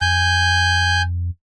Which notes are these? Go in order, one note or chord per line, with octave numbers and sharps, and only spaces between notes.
F2 G#5 G6